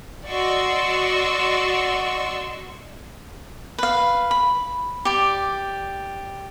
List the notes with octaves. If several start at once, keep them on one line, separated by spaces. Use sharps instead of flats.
F#4 D5 D#5 C6 C#6 E6
B4 F5
B5
G4 D5